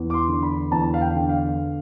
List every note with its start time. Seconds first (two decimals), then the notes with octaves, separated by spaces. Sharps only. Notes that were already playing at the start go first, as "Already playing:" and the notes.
Already playing: E2 E3
0.10 D6
0.14 C6
0.28 D3
0.43 B5
0.71 E2 A5
0.94 F5
1.01 G5
1.15 D3
1.29 F5